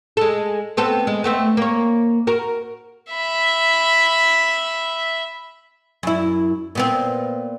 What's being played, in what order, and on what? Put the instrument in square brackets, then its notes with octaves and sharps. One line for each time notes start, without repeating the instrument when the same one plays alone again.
[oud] G#3 A4
B3 C4 A4
G#3
A3 B3 C4
A#3 C#5
F#4 A#4
[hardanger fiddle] E5 B5
[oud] F#2 E4
A#2 B3 C4